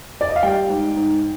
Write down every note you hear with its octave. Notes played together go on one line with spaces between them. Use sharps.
D5
D#5
F5
G3 G5
G#2
G#2